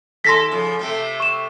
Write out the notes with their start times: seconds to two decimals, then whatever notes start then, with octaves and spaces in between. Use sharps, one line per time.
0.24 D#2 A4 C6 A#6 B6
0.51 C#3 F3
0.79 C3 A3 C4
1.20 C#6 E7